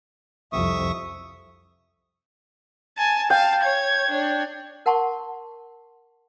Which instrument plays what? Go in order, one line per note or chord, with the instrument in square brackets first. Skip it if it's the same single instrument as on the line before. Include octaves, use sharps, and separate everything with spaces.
[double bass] C2 F2 [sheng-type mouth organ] E5 C#6 D#6
[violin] G#5 A5
[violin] F5 A5 [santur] G5
[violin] C#5 G#6
D4 C#5
[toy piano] A#4 F#5 A5 C6 C#6